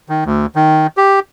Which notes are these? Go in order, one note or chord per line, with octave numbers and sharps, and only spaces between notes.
D#3
D2
D#3
G4